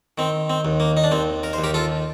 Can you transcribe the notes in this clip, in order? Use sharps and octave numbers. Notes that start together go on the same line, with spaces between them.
D#3 C4
C4
D#2
A#3
D#4
D4
D#2 C4
A#4
C5
D#2
G4 A#4
F4 A4